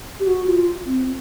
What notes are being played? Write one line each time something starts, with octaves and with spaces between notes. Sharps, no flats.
G4
F#4
F4
C4